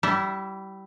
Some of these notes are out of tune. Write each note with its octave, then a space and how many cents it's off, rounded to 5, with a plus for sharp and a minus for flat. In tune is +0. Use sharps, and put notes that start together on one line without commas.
G3 -25 E4 -5